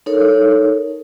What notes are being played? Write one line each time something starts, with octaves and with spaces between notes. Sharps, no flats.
D#4 A4 A#4 C#5